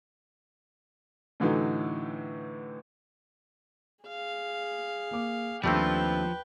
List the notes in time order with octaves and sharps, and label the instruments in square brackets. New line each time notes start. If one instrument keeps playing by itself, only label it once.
[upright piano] A2 D3 E3 F#3 D#4
[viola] G#4 F5
[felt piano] A#3 D6
[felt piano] D#2 D4 [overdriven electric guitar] F3 [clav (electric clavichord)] G3 A3 C4 [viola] B4 G5